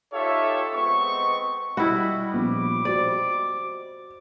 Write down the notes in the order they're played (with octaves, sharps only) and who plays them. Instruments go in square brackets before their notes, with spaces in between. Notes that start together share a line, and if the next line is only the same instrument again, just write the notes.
[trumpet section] D#4 F4 G4 A4 C#5 E5
G#3 B3 C4 D#5 C#6
[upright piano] G3 D#5 B5 [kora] E4 F#4
[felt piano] A#1 B3 [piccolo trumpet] D6
[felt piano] F#4 C5 [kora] D5